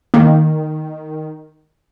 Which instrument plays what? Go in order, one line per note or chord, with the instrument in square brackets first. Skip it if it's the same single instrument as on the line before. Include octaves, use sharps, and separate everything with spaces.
[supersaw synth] D#3 [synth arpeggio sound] A#3